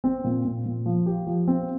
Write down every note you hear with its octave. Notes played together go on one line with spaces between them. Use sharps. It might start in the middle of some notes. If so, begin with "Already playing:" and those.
C4
A#2
A#2
A#2
F3
G4
F3
C4